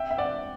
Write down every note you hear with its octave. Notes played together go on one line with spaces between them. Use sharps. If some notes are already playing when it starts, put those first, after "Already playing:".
Already playing: E5 G5
E5
D5 F#5